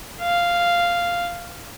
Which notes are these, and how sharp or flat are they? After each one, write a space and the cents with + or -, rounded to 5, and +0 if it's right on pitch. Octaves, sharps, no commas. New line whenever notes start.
F5 -5